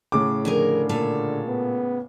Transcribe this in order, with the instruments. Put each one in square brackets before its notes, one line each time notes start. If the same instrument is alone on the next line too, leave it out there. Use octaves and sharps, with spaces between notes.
[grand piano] A2 C#3 D6
[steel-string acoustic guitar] F2 G#4 A#4 [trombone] D3
[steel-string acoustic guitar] A#2 A4 F5
[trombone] B3